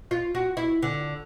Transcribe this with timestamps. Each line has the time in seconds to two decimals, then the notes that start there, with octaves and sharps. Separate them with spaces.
0.11 F4
0.35 F#4
0.57 E4
0.82 D3